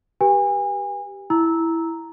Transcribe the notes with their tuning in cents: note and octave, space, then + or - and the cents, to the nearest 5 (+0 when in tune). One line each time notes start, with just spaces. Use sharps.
G4 +0 B4 -25 G#5 -35
E4 +0 A#5 +0 E6 -15